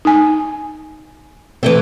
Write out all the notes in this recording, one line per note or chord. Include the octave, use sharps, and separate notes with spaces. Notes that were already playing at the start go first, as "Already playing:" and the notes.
D#4 G#5
E3 A3 C4